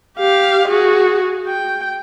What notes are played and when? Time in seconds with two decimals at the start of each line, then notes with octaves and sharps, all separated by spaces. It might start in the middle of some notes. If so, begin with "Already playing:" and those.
0.18 G4 F5
0.68 F#4 G#4
1.48 G5